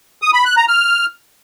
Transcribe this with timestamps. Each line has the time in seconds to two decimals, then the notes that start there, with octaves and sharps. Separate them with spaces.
0.22 D#6
0.33 B5
0.45 F#6
0.57 A#5
0.68 F6